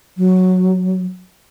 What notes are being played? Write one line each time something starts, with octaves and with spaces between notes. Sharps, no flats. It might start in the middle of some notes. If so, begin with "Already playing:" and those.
F#3